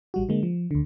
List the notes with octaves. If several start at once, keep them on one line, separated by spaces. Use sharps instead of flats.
A1 G3 F#4
D3 G#3 A#3
F3
D2 D3